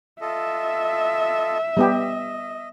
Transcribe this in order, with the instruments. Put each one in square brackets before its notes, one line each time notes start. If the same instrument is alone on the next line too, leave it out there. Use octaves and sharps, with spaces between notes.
[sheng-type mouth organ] F4 A4 D#5 [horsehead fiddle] E5
[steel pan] G3 B3 G4 [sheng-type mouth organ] D#5